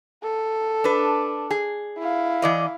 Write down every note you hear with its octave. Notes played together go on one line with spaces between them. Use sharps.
A4
D4 B4
G#4
E4 F5
E3 D5 D#5